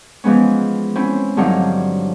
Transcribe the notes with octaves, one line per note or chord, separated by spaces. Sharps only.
E3 F3 G#3 B3 C#4
C4 C#4 E4
G2 D3 F3 F#3 C4 D#4